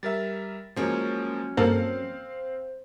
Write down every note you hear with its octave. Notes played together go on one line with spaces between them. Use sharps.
G3 A#4 E5 A6
F3 F#3 G#3 A#3 C#4
G2 A#3 C4 A4 C5 F5